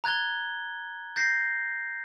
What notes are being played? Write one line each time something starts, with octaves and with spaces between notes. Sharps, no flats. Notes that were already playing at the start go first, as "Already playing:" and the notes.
A#5 F#6 G#6 A6 G7
G6 A6 A#6 C7